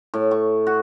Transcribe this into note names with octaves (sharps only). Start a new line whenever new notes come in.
A2
C#6
F#4